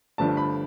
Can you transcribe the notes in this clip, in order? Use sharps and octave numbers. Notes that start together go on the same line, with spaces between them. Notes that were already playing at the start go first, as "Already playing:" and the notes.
G1 G2 D3 F3 A3 A5
B5